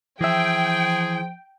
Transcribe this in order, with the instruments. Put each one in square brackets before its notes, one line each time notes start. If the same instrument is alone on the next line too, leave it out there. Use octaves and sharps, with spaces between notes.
[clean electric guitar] E3 E5 [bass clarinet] F3 [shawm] G#4 [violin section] G5